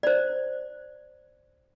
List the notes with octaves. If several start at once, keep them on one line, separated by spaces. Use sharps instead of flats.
C5 D5